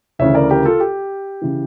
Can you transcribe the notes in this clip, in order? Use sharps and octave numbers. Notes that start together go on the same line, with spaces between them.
D2 C#3 E3 C#5 E5
A#4 D5
G4 A#4
F4 A4
G4
C#3 E3